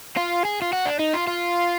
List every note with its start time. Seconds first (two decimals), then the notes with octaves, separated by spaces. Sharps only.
0.17 F4
0.45 G#4
0.62 F4
0.73 F#4
0.85 D4
0.99 D#4
1.13 F4
1.27 F4